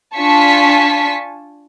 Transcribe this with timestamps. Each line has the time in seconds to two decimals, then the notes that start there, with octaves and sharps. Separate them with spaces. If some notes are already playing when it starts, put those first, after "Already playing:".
0.17 D4 F4 G#5 A5 C#6 B6